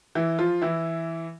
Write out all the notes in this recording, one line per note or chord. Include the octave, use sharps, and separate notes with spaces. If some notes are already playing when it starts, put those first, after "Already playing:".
E3 E4
F3 F4
E3 E4